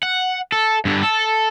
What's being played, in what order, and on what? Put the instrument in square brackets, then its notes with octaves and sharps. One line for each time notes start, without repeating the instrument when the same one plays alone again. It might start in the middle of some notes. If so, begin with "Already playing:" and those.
[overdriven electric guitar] F#5
A4
G2 D3
A4